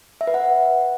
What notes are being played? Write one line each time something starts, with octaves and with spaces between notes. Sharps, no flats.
E5
B4
F#5